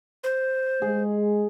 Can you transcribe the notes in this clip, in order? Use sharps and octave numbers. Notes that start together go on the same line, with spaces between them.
C5
G#3 G#4